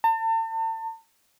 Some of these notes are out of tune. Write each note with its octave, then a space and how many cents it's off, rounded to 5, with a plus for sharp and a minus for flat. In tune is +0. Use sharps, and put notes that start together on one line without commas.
A5 +40